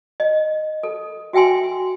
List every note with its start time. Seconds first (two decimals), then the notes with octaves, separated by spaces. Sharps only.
0.20 D#5
0.83 A4
1.33 F#4 E5 G5 G#5 C6